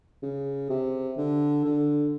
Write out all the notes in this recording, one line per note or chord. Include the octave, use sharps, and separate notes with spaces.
C#3
C3
D3
D3